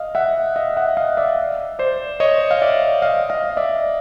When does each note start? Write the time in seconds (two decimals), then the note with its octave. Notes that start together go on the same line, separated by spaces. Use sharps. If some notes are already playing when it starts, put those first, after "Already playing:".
Already playing: D#5 F5
0.15 E5 F#5
0.56 D#5 F5
0.77 E5 F#5
0.97 D#5 F5
1.17 D5 E5
1.79 C5 D5
2.20 C#5 D#5
2.51 F5
2.62 D5 E5
3.02 D#5 F5
3.30 D#5 F5
3.57 D5 E5